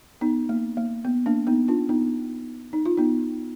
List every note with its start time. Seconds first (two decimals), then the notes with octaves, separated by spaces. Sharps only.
0.21 B3 D#4
0.49 A#3
0.77 A#3
1.05 B3
1.26 A#3 D4
1.47 B3 D#4
1.68 D4 F4
1.89 B3 D#4
2.73 D#4
2.86 F4
2.97 B3 D#4